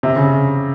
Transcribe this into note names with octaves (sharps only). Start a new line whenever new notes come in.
C3
C#3